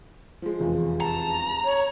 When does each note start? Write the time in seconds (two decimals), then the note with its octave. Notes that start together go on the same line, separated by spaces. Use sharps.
0.42 F3 G#3
0.60 F1 E2 F4
1.01 A5 A#5
1.65 C#5